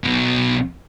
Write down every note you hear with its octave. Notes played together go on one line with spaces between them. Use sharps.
B1 B2